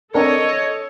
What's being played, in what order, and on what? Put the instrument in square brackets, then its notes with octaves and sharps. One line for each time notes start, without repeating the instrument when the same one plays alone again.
[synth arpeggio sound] C4 D4 A#4 [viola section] A4 [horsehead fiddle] C#5 [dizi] D#5